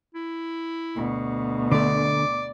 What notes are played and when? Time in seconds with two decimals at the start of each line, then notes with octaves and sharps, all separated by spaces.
0.15 E4
0.96 D2 B2
1.72 D3 A3 D5 D6